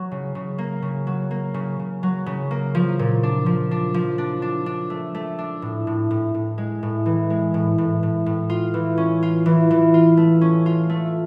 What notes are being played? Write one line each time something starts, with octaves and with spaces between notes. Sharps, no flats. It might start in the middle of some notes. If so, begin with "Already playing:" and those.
Already playing: F#3
C#3
C#3
A#3
C#3
F#3
A#3
C#3
C#3
F#3
C#3
A#3
F3
A#2
D4
F3
D4
F3
D4
D4
D4
A3
A3
D4
A2
A2
A2
A2
G#3
A2
E3
G#3
A2
A2
A2
A2
F4
E3
C#4
F4
E3
E3
F4
A3
C#4
F4
A3